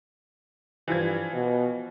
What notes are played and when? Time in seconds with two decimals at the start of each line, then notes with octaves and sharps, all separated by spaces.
0.88 G2 E3 F3 G#6
1.34 B2